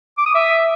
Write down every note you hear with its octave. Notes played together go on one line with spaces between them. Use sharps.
D6
D#6
E5